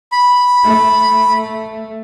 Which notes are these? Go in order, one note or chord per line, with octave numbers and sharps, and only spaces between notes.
B5
A3